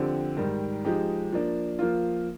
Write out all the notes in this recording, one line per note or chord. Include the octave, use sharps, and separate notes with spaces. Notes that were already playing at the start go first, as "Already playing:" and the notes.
Already playing: D3 F3 C4 G4
G#2 D#3 G3
F3 G#3 D#4 G4
F3 A#3 D4
F3 A#3 F4